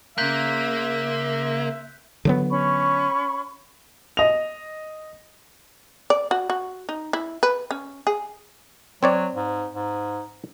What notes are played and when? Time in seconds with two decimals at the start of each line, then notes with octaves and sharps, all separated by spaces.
0.18 C#3 A#3 E5 C6 F#6 G6 B6
2.25 D3 F#3 B3
2.50 C#4 B5 C#6
4.17 D#5 F7
6.10 D5
6.31 F#4
6.50 F#4
6.89 D#4
7.13 E4
7.43 B4
7.71 C#4
8.07 G#4
9.03 F#3 C4 C#5 D5
9.35 G#2
9.74 G#2